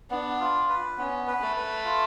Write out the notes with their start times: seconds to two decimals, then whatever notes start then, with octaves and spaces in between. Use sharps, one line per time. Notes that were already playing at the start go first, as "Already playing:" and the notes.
0.11 B3 D4
0.40 F4
0.69 B4
0.98 B3 C#4
1.27 B4
1.42 A3
1.56 B4
1.85 F4